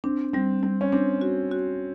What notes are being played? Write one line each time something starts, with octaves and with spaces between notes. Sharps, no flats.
C4 D4
G3 C4
G3 C4
C#4
C4 D4
F#4
F#4